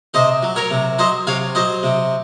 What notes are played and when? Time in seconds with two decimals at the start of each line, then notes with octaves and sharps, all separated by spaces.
0.14 C3 C5 D#5
0.43 F#3
0.56 A#4 C#5
0.71 C3
0.99 F#3 C5 D#5
1.27 C3 C#5 F5
1.55 F#3 C5 D#5
1.83 C3